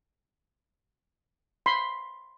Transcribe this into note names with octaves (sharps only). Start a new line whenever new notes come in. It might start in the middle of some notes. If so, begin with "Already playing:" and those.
B5 C6